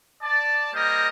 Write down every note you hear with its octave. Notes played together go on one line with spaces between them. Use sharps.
D5 A5
G3 A#3 G4 A#4 C5 D#5